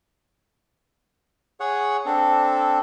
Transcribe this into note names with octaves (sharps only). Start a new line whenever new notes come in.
G#4 C#5 F#5
C4 D4 A4